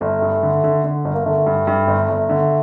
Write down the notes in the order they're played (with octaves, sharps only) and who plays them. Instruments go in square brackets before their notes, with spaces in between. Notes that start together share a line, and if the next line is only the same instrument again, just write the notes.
[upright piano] G1 [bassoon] A3
[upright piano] G2
D3
D3
D3
G1
[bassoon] A#3
[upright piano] D3 [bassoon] A3
[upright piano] G2
G2
G1
G1
D3